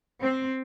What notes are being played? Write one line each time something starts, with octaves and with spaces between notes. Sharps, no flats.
C4